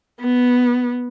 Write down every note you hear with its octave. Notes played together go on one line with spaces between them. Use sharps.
B3